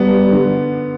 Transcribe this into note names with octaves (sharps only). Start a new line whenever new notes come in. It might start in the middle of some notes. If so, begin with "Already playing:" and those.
Already playing: G2 G3 B3
D3